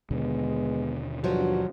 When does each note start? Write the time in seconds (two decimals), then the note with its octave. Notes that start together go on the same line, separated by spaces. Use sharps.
0.11 D#2 B2 D3 G#3 B3
1.24 G2 F3 F#3 F#4